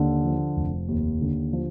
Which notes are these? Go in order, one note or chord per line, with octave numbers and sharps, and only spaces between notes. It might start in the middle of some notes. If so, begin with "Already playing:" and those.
Already playing: D#2 D3
F3
F1
D#2
D3
F3